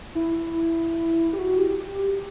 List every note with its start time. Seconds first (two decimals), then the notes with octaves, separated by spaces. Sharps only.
0.15 E4
1.33 G4
1.39 F#4
1.58 G4
1.79 G4